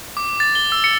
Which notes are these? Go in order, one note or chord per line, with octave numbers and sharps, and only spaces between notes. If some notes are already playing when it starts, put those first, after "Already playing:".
D6
A6
G7
E6
C#7